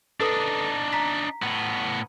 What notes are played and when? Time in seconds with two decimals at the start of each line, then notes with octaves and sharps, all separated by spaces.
0.21 D4 D#4 A4 B4 D#6
0.93 A#5 B6
1.42 A2 B3